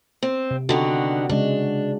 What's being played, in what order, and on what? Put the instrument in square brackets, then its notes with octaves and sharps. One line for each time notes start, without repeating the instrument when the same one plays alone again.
[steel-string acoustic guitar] C4
[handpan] C3
[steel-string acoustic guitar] D3 D#3 B3 [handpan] F#4
[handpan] C#3 G#3 [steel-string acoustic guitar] D4